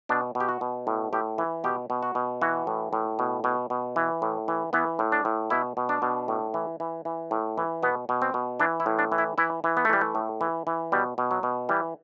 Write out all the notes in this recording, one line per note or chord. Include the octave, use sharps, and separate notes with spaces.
B2 D4
B2
G4
F#4
B2
A2
A2 G4
E3
B2 G4
B2
F#4
B2
E3 F#4
A2
A2
B2
B2
B2
E3
A2
E3
E3 B3
A2
D4
A2
B2 E4
B2
D4
B2
A2
E3
E3
E3
A2
E3
B2 B3
B2
C4
B2
E3 D4
E4
A2
D4
E3
E4
E3 E4
E3
B3
A3
E3 G3
A3
A2
E3
E3
B2 G3
B2
F#3
B2
E3 G3